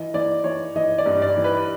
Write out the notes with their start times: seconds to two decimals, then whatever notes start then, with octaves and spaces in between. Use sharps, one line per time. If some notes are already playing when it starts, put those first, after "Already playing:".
Already playing: E3 D#5
0.14 E3 D5
0.44 E3 C#5
0.76 E3 D#5
0.98 D5
1.06 G2
1.22 D5
1.37 E3
1.44 B4